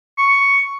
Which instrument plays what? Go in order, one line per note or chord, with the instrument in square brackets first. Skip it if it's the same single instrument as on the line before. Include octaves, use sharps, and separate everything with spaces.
[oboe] C#6